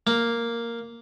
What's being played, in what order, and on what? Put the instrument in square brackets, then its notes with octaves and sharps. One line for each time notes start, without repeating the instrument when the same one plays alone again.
[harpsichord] A#3